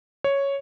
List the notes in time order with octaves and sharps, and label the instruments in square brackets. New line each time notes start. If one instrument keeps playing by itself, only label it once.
[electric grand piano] C#5